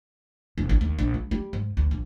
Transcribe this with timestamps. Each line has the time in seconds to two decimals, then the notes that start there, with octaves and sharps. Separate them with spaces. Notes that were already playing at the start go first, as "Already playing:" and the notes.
0.58 E1
0.69 A1
0.81 D#2
0.99 A#1
1.14 G3
1.31 G3
1.53 G#2
1.77 D2
1.91 A#1